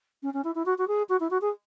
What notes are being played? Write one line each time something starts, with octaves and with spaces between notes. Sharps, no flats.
C#4
C#4
E4
E4
F#4
F#4
G#4
F#4
E4
F#4
G#4